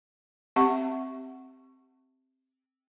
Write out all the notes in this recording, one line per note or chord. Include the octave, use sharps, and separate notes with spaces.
C4 G4 E5 F#5 C#6